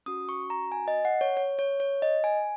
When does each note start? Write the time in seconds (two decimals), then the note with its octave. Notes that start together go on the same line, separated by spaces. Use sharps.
0.06 C#4 F#4 D#6
0.29 C#6
0.50 A#5
0.72 G#5
0.88 D#5
1.05 F#5
1.21 C#5
1.37 C#5
1.59 C#5
1.80 C#5
2.02 D#5
2.24 G#5